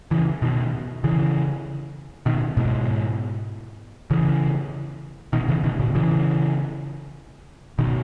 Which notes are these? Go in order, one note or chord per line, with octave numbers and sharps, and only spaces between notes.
C#3 E3
B2 D#3
C#3 E3
B2 D#3
G#2 B2
C#3 E3
B2 D#3
C#3 E3
B2 D#3
A#2 C#3
C#3 E3
B2 D#3